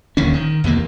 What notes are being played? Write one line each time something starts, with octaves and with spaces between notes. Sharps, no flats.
D1 D#2 D3 C#4
D#3
B1 E2 C3 A#3